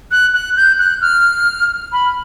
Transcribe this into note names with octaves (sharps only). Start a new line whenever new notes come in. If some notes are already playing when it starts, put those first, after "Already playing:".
F#6
F#6
G6
F#6
F6
B5